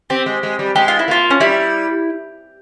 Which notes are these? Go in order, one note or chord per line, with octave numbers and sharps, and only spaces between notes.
C4 G4
G#3
G#3
G3
G#3 G4
F4
E4
A#3 F4
C#4
G3 E4